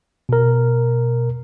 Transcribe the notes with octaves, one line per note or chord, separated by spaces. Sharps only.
B2 A#4